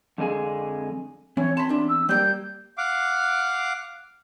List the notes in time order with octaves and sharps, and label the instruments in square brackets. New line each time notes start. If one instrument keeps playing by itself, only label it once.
[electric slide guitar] F2 D3 G#3 G#4
[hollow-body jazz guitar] E3 [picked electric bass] C4 C#4 [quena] C#5
[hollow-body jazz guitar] A5 B5 [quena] C6
[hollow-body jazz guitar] E2 D4
[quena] E6
[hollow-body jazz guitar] G3 A#3 G5 [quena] G6
[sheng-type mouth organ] F5 F#5 D6